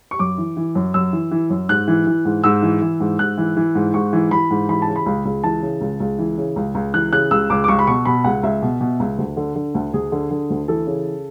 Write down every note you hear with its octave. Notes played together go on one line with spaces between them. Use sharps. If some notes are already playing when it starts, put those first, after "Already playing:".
C#6
F#2 D6
E3
E3
F#2
F#2 E6
E3
E3
F#2
G#2 F#6
E3
E3
G#2
G#2 E6
E3
E3
G#2
G#2 F#6
E3
E3
G#2
G#2 C#6
E3
E3 B5
G#2
E3 B5
A5
C#3
B5
C#2
C#2
E3 A5
C#3
C#2
C#2
E3
C#3
C#2
C#2
E3 F#6
C#3 F#6
C#2 E6
C#2 D6
D6
C#2 C#6
B5
B2 C#6
B2 B5
C#2 F#5
C#2 E5
B2
B2
C#2
D2
D3
D3
D2
D2 G#4
D3
D3
D2
E3 A4
C#3